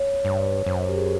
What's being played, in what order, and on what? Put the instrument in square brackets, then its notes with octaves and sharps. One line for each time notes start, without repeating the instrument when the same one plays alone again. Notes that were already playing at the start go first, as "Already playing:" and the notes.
Already playing: [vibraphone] C#5
[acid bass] G2
[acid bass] F#2 [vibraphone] C5
[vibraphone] G4
G#4